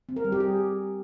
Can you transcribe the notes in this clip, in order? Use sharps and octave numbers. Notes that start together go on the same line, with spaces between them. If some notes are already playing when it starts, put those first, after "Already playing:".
C4
A#4
G3
G4
G#4